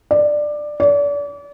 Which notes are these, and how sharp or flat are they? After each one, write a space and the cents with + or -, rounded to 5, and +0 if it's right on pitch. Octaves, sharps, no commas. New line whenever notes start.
D5 +15
D5 -35